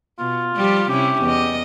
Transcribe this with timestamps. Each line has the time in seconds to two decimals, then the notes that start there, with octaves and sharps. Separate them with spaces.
0.19 B2 F4
0.56 F3 G3 G4
0.90 C3 C#4 E4 G4
1.22 E2 D#5